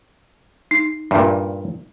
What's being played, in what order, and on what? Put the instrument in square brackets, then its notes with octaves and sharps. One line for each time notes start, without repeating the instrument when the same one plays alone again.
[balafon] D#4
[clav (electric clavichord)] G2 A#2 [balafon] E5